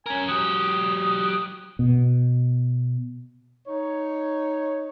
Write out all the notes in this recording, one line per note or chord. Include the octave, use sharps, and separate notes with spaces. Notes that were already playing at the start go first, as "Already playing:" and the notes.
C#4 A#4 G#5
F#3 G4 D#6
B2
D#4 C#5